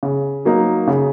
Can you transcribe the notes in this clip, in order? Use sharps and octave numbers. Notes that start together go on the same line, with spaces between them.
C#3
F#3 A#3 D#4
C#3